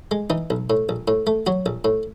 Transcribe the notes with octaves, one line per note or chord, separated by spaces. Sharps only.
G#3
E3 D#4
B1
A2
A#1
A2
A3
F#3 F#4
A#1
A2